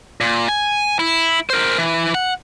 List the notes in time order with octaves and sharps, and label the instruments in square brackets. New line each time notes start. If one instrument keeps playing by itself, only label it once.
[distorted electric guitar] A#2
G#5
E4
A#4 C5
E3
F#5